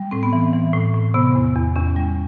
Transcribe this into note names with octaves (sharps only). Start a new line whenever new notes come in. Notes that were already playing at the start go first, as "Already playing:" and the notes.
Already playing: G3
A2 C4
B3
E3
E3
A2
A2
C3 B3
E2
E2
E2 C#4
G3